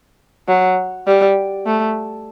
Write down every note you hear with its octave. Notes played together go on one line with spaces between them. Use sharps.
F#3
G3
A3